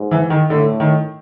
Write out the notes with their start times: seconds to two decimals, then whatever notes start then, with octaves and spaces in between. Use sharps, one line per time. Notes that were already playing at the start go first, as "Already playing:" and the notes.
Already playing: G#2
0.11 E3
0.30 D#3
0.50 A2 D3
0.80 D#3